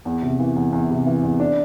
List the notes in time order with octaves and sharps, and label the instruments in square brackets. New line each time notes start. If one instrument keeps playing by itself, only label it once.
[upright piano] E2
C3
E3
E2
E2
C3
E3
E2
D4